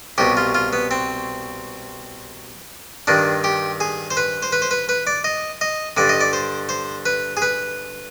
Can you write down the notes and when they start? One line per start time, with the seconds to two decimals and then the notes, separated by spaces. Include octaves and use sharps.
0.18 C2 B2 G4
0.37 F4
0.55 F4
0.73 B3
0.91 C4
3.07 G2 D#3 D4
3.44 G4
3.80 G#4
4.11 C5
4.17 B4
4.43 C5
4.52 B4
4.62 C5
4.71 B4
4.89 B4
5.07 D5
5.24 D#5
5.61 D#5
5.97 G2 D3 D5
6.09 D#5
6.21 D5
6.33 C5
6.69 C5
7.06 B4
7.37 G#4
7.42 B4